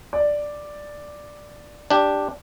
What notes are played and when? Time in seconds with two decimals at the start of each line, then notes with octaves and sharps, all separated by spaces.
0.13 D5
1.90 D4 G4